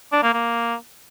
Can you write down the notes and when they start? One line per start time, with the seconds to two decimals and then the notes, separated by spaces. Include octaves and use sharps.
0.12 D4
0.23 A#3
0.33 A#3